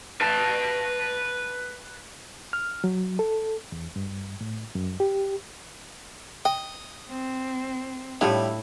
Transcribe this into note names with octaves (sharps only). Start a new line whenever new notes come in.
B4 A5
F6
F#3
A4
E2
G2
A2
F#2
G4
D#5 G5
C4
A2 G3 A3 D4 E4 F4 G4